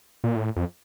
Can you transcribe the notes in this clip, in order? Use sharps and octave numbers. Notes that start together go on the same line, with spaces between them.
A#2
A2
F2